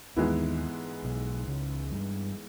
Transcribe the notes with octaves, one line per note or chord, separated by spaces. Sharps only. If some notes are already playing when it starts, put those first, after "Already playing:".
D#2 G#2 D#3 E3 G#3 B3 E4
B1 B2
C#2 C#3
G2 G3